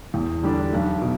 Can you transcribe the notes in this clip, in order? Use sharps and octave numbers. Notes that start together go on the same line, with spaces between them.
E2
D3 G3 D4
B1
B2